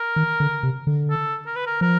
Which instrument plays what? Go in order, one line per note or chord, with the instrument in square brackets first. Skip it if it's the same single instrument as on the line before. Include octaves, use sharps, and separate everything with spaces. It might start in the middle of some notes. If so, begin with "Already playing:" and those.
Already playing: [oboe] A#4
[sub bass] D#3
D3
C3
D3
[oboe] A4
A#4
B4
A#4
[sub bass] F3 [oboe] A#4